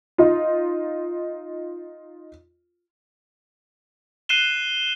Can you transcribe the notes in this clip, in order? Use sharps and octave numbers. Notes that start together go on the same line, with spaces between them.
D#4 F4
F#6 C7 D#7 E7 G7